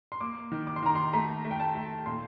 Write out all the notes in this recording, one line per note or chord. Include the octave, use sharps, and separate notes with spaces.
C6
A#3 D6
D#3
D6
C6
D#3 A#5
C6
A3 A#5
A3
G5
A5
A3
A#2 C6